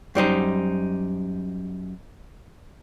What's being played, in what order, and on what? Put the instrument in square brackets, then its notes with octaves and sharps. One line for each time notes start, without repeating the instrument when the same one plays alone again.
[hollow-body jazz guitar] F#2 G3 D#4 C5